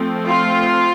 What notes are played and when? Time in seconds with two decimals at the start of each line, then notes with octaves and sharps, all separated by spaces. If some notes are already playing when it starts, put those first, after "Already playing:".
Already playing: F3 A3 C4
0.27 F4